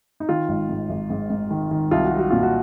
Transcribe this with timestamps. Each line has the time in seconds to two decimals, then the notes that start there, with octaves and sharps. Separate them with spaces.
0.20 D#4
0.29 D#3 F4
0.49 G#1
0.69 G#2
0.90 G#1
1.10 G#2
1.30 G#2
1.51 D#3
1.71 D#3
1.91 C2 F4
2.05 F#4
2.12 F#3
2.18 F#4
2.30 A#2 F4
2.43 F#4